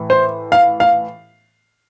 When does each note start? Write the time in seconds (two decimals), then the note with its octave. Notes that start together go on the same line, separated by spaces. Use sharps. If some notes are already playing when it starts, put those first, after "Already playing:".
Already playing: A2 E3
0.10 C5
0.52 F5
0.80 F5